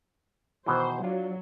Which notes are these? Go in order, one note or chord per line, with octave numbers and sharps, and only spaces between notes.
B2 D#3 E3 C5
F#3 D4 F4